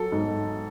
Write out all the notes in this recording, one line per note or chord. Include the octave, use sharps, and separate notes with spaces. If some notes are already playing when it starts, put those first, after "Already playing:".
Already playing: F#3 A4
G#2